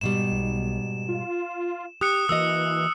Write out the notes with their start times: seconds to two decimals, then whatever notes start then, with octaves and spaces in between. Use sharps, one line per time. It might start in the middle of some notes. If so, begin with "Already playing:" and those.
0.01 G#2 B2 G3 E7
0.32 B1
1.09 F4
2.01 G4 D#6 F#6 C#7
2.29 E3 A#3 F#4 D#5 E6